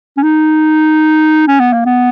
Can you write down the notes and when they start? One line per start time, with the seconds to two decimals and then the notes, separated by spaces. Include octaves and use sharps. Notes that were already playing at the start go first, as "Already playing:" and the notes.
0.17 C#4
0.23 D#4
1.47 C#4
1.60 B3
1.73 A#3
1.86 B3